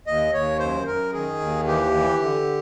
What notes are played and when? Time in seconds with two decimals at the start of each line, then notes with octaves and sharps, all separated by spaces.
0.07 D#2 D#5
0.33 D#2 C#5
0.59 F#2 C5
0.87 F#2 A#4
1.13 D#3 G#4
1.40 D#2
1.67 E3 G4
1.93 E3
2.21 D3